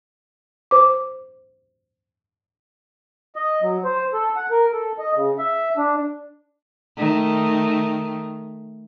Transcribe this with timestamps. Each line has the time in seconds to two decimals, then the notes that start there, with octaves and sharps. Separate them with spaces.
0.71 C5 D6
3.36 D#5
3.62 F#3
3.84 C5
4.13 A4
4.36 F#5
4.51 A#4
4.73 A4
4.99 D#5
5.15 C#3
5.38 E5
5.77 D4
6.97 D#3 A3